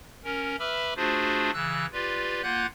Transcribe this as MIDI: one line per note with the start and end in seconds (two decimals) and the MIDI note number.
0.24 0.56 61
0.24 0.56 70
0.60 0.94 71
0.60 0.94 76
0.60 0.94 83
0.60 0.94 86
0.60 0.94 88
0.60 0.94 89
0.96 1.51 57
0.96 1.51 62
0.96 1.51 65
0.96 1.51 66
0.96 1.51 68
0.96 1.51 72
1.53 1.86 49
1.53 1.86 52
1.53 1.86 88
1.53 1.86 90
1.93 2.42 65
1.93 2.42 67
1.93 2.42 71
1.93 2.42 74
2.43 2.66 58
2.43 2.66 65
2.43 2.66 78
2.43 2.66 90
2.43 2.66 91